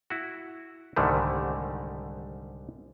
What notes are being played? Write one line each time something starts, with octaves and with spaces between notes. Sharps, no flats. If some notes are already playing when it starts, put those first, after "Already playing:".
E4 F#4
C2 G#2 D3 D#3 G3 A3